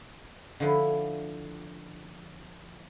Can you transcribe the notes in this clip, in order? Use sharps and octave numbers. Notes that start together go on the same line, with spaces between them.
D3 F3 E4